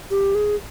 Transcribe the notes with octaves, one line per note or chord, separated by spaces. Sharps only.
G4
G#4